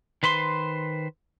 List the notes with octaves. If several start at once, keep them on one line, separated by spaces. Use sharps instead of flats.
D#3 B4 C5 C6